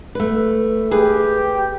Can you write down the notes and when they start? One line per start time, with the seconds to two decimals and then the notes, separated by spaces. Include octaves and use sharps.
0.15 A3 B4
0.91 G4 G#4 B4